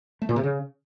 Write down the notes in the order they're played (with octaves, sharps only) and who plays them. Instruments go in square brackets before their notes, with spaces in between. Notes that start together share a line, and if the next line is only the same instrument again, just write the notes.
[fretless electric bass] A3
A#2
C3
C#3